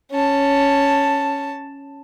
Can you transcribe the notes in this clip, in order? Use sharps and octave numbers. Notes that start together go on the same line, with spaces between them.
C#4 A5